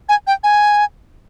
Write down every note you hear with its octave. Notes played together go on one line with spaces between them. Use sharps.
G#5
G5
G#5